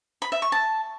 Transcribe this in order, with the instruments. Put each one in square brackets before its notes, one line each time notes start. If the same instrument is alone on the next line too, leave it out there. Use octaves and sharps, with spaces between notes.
[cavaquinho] B5
E5
C#6
A5